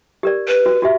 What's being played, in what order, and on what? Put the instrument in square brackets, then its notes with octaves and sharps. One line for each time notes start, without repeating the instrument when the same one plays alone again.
[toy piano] G4 A#4 D5
[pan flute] B4
[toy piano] F#4
F#4 G4 E5